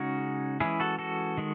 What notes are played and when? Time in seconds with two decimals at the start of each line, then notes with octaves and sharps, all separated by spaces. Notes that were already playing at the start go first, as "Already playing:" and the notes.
Already playing: C#3 G#3 C#4 D#4 F#4
0.60 E3 G#3 C#4 E4 G#4
0.80 F#4 A4
0.99 F#4 A4
1.38 D#3 G#3